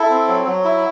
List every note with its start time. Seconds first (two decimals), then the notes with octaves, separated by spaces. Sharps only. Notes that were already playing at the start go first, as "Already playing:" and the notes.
Already playing: E4 A4
0.10 C4
0.28 F#3
0.46 F#3
0.64 E4